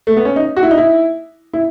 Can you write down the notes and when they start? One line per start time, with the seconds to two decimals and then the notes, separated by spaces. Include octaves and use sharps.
0.07 A3
0.17 B3
0.25 C#4
0.36 D#4
0.57 F#4
0.63 E4
0.71 D#4
0.78 E4
1.53 E4